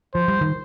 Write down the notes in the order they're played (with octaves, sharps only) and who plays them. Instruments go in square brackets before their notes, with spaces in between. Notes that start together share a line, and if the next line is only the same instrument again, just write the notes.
[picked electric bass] F3 [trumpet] C5
[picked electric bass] G3
D#3